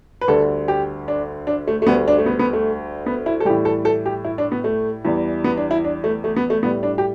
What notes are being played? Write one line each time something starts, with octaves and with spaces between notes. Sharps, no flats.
B4
D2 D3 G3 A4
G4
D4
D4
A3
A3
D2 D3 G3 B3
D4
A3
B3
B3
A3
B3
E4
A4
A2 E3 G3 G4
A4
A4
G4
E4
D4
B3
A3
E2 E3 G3
B3
D4
E4
D4
A3
A3
B3
A3
A2 G3 B3
D4
G4